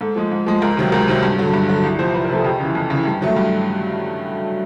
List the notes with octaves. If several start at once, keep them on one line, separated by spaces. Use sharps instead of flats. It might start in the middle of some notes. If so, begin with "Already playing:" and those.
G#2 A4
F3 G#3
G#2
F3 G#3
C#2 A#4
C3 D#3 F#3
C#2 A#4
C3 D#3 F#3
G2
D3 F#3
G2
D3 F#3
C2
C3 F3 C5
C2 B4
A#4
C3 F3 A4
G#4
F2 G4
C#3 E3
F2
C#3 E3
G2
D#3 F#3 A3
G2